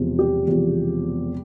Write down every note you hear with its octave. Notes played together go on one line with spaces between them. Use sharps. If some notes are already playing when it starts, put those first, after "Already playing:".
Already playing: E1 E2 C3 F3
G4
E1 E2 C3 F3